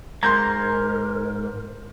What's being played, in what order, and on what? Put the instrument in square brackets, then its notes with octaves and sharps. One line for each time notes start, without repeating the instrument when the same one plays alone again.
[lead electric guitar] G#2 [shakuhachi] A#4 [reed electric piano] A#5 [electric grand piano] C6 G6 G#6